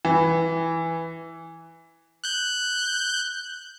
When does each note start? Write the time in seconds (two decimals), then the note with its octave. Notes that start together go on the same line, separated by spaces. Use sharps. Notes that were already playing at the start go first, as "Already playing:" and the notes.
0.05 E3
2.24 F#6 G6